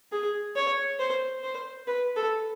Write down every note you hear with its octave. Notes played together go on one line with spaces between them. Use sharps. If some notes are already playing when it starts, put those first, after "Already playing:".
G#4
C#5
C5
C5
B4
A4